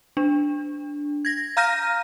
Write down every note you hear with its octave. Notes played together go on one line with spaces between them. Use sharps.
D4
G#6 A#6
F5 A#5 F6 G6 A#6 D#7